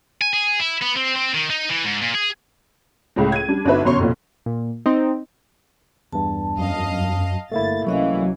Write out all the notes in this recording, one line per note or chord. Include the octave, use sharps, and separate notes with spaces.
G#5
G#4
E4
B3
C4
C4
D#3
D#4
E3
G#2
A#2
G#4
C#2 A2 G#3
G#6 D#7
G3 D4
G1 D4 D#4 F#4 B4 E5
G1 F#2 B2 C#5 C6 C#6
F1 B1 A#2
A#2
C4 D#4
E2 G2 A5
F#2 D#5 F5
G1 A3 A#3 E4 A6
C2 E3 F#3 C#4 D#5 F5